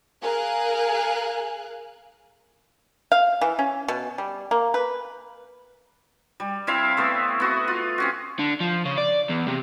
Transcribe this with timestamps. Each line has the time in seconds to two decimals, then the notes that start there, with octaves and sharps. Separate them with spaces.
0.23 G#4 A#4 F5 G#5 F#6
3.12 F5
3.41 E3
3.59 C#4
3.88 B2
4.18 G3
4.51 A#3
4.74 B4
6.40 G3
6.67 C4 E4 E5 F5
6.97 A3 B3 C4
7.40 B3 F#4
7.68 F4
7.98 C4 C#4 F#4
8.39 D3
8.60 F3
8.85 C#3
8.98 D5
9.29 E2
9.48 C3